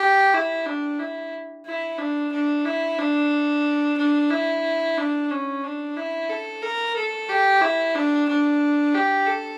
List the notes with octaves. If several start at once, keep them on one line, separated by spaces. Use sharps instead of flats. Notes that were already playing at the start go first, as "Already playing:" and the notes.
Already playing: G4
E4
D4
E4
E4
D4
D4
E4
D4
D4
E4
D4
C#4
D4
E4
A4
A#4
A4
G4
E4
D4
D4
G4
A4